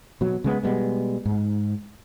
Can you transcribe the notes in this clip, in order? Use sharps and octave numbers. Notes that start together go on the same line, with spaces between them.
B2 F#3
C#3 G#3 B3
B2 G3 G#3 B3
G#2